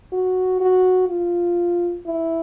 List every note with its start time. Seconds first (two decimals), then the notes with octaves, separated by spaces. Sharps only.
0.13 F#4
0.61 F#4
1.09 F4
2.07 E4